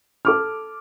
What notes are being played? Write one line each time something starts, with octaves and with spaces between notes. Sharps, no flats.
A4 D6 F6